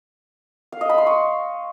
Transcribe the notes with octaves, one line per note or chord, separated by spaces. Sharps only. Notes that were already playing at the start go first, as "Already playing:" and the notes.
F5
D#5
B5
C6
C#6